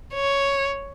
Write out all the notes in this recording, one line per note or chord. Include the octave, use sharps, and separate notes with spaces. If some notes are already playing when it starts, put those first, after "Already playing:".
C#5